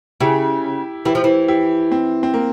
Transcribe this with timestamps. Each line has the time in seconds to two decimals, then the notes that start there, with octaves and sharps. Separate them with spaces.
0.20 C#3 E4 G4
1.05 E3 E4 G4
1.15 F3
1.24 E3
1.48 E4 G4
1.92 C4
2.23 C4
2.34 A#3